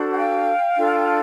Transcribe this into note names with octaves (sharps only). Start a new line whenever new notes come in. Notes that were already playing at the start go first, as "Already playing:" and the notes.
Already playing: D4 F#4 A4 C5
F#5
F5 G5
D4 F4 A4